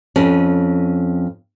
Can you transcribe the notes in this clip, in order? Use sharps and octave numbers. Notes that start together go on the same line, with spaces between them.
F2 C#4